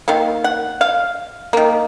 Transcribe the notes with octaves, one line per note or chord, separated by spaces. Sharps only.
D#3 A#3 F5
F#5
F5
D#3 A#3